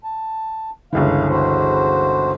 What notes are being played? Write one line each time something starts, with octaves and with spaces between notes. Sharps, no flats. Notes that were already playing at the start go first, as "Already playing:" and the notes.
A5
G1 C#2 E3 F5
F#4 C5